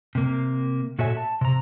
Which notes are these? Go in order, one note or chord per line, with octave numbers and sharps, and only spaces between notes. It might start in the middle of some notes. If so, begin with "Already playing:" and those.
C3 A#3
A#2 F#4 A4 C#5 E5 G#5
A5
C3 A#5